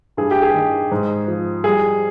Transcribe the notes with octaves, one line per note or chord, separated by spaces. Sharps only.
G2 G#4
G4
G#4
D#3
G#2
F3
G3 G#4